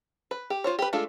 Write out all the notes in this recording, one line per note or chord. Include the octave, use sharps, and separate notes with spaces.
B4
G4
F4 C5 C#5
G4 B4
G#3 A3 D4 F4 A4